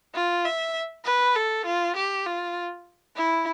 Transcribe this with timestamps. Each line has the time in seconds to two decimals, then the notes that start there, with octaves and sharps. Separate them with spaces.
0.14 F4
0.45 E5
1.05 B4
1.36 A4
1.65 F4
1.96 G4
2.26 F4
3.16 E4